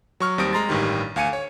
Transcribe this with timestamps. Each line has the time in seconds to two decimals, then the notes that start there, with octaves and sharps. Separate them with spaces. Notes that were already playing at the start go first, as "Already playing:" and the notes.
0.20 F#3 C#6 F6
0.38 D#2 G3 C4 D#6 A#6 D7
0.53 G#3 A#5 C6 A6
0.69 A1 G2 D#3 G3
1.16 D2 F5 G#5 C#7 D#7
1.33 C#5